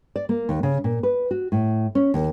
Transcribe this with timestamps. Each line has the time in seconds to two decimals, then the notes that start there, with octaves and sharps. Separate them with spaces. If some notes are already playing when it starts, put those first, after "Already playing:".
0.16 D5
0.29 A#3
0.49 D#2
0.63 C#3
0.84 A#2
1.03 B4
1.31 F#4
1.52 A2
1.95 C#4
2.14 D#2